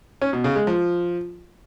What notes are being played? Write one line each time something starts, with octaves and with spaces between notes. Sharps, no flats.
C#4
B2
C#3
G#3
F3